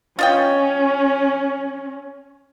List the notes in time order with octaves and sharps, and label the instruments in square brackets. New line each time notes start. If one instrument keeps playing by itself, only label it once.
[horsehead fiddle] C#4 [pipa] F4 D#5 G5